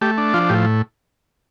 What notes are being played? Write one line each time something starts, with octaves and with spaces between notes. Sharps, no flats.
A3 G4
D4
F3 F4
A2 G4